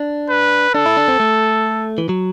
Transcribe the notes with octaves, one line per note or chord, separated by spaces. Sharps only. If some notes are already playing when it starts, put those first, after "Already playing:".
Already playing: D4
B4
D4 A4
E4
D4
C4
A3
E3
F#3